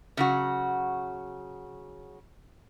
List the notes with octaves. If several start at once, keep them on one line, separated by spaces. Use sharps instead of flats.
C#3 F#3 F#4